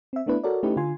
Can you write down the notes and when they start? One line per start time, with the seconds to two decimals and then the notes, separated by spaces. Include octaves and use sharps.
0.13 C4 E5
0.26 A3 B3 D4 E4 B4
0.44 F#4 A4 A#4 C#5 D5
0.63 A3 C#4 D#4 E4 G4 B4
0.77 D3 F4 G#5 C6